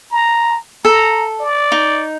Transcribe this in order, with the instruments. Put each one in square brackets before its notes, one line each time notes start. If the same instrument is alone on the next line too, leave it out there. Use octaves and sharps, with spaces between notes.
[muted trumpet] A#5
[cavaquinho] A4 [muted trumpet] A#5
[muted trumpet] D5
[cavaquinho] D#4